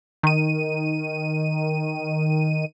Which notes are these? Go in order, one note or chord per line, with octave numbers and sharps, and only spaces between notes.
D#3 D#7